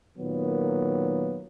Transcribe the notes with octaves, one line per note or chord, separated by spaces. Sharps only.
A#2 D#3 F#3 A#3 B3